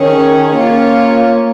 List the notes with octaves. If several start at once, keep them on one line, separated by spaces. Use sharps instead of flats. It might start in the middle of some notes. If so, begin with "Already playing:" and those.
Already playing: D#3 C#4 G#4 C#5
A#3 C#4 F4 C#5
A#3